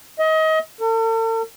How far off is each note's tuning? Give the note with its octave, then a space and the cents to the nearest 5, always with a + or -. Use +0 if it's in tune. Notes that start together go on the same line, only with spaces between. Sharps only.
D#5 +30
A4 +45